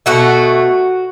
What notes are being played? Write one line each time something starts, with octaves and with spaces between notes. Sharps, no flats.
B2 A3 F#4